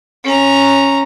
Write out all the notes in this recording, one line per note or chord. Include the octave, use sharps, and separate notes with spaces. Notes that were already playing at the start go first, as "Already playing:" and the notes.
C#4 A#5